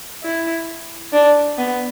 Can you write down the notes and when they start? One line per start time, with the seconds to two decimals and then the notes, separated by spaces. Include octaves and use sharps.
0.23 E4
1.13 D4
1.57 B3